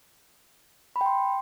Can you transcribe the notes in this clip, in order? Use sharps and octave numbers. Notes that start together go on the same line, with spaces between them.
B5
G5
C6